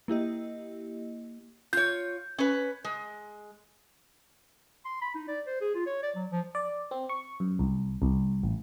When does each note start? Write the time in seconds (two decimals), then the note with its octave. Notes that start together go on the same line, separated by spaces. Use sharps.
0.08 A#3 E4 G4 D#5
1.73 F4 C#5 G6
2.38 C#4 B4
2.84 G#3
4.85 C6
5.02 B5
5.15 D#4
5.28 D5
5.47 C5
5.61 G#4
5.75 F4
5.86 C#5
6.03 D5
6.15 F#3
6.31 F3
6.55 D5
6.91 C4
7.09 C#6
7.40 F#2
7.59 C2
8.02 C2
8.43 A1